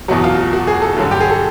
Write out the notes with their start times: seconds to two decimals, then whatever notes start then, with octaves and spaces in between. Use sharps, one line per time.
0.08 E2 B2 F#3 F#4
0.24 F4
0.38 F#4
0.53 F#4
0.67 G#4
0.82 A4
0.97 G2 D3 F#3 F#4
1.11 G4
1.20 G#4
1.31 A4